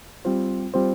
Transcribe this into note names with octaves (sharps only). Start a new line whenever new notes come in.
G3 C4 F4 C5
G3 C4 F4 C5